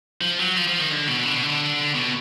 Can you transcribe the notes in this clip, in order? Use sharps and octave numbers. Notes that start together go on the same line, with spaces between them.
F3
F#3
F3
F3
D#3
D3
B2
D3
B2
D3
B2